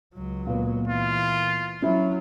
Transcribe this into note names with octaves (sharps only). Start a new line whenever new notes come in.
C#2 F#3
A#2 B3
E3 F4
F#3 C#4 E4